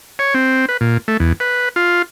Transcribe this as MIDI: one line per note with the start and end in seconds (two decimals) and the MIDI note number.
0.19 0.34 73
0.34 0.66 60
0.69 0.77 71
0.81 0.98 46
1.08 1.17 57
1.20 1.32 40
1.40 1.69 71
1.76 2.02 65